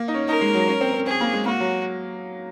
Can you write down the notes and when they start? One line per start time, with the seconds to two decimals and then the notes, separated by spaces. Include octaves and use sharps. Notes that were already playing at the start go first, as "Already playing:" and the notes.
Already playing: A#3
0.08 D#4
0.14 C#4
0.29 D#4 A#4
0.41 G#3
0.54 F#3
0.68 C#4
0.81 C4
0.94 C4
1.07 C4 G#4
1.21 A#3
1.33 G#3
1.46 A#3 F#4
1.60 F#3